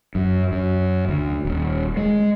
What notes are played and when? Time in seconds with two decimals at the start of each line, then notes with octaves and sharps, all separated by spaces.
0.15 F#2
0.52 F#2
1.08 D2
1.45 D#1
1.97 G#3